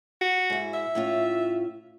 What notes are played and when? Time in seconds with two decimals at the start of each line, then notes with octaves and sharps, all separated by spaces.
0.21 F#4
0.50 G#2 E4
0.74 E5
0.95 A2 C#4 F4